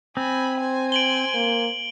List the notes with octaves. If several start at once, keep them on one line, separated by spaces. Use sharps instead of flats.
C4 G#5 B5
C5 G#5
D7 F#7 G7
A#3